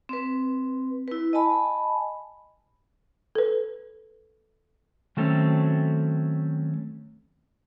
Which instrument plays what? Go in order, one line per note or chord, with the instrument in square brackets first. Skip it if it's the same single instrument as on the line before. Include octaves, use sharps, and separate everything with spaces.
[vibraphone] C4 B4
E4 B4
D#5 G#5 A5 B5
[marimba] A4 B4
[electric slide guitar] D#3 F#3 A3 C4 C#4